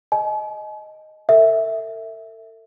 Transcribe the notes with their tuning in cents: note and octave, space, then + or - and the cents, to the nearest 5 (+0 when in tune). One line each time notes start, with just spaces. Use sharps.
D#5 +0 G#5 +45
A4 +45 E5 -10